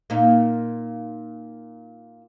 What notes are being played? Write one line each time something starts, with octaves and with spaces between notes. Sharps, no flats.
A#2 A#3 D#4